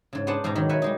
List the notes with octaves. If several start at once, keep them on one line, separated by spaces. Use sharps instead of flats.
G#2 C#3
B3 D4 C5 F#5 A5
G#2 B2 D#4 G4 A#5
D#3 F#3
F#4 B4 C#5 E5
G3 G#3 D#4